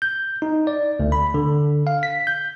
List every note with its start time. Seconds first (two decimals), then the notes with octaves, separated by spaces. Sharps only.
0.02 G6
0.42 D#4
0.67 D5
1.00 D2
1.12 B5
1.34 D3
1.87 F5
2.03 B6
2.27 G6